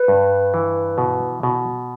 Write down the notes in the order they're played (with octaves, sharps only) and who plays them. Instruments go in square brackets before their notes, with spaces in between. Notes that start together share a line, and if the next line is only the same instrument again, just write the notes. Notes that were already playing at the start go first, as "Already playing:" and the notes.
Already playing: [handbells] B4
[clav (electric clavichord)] G2
E3
B2
B2